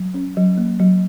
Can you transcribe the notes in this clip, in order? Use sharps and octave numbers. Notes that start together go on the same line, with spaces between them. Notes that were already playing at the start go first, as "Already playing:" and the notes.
Already playing: F#3
C#4
F#3
A#3
F#3